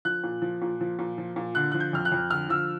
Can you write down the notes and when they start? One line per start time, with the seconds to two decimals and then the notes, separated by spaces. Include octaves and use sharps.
0.05 F3 F#6
0.24 A#2
0.42 F3
0.62 A#2
0.81 F3
0.99 A#2
1.18 F3
1.36 A#2
1.55 D3 F#6
1.72 F3 F#6
1.80 G6
1.93 F2 F6
2.05 F#6
2.12 F2
2.31 D3 F6
2.49 F3 E6